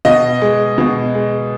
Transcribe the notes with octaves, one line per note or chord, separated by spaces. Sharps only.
B2 D#5
G#3
B2
G#3